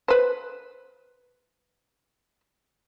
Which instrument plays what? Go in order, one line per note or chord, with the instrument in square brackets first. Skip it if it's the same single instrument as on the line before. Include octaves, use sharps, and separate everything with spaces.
[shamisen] B4 C5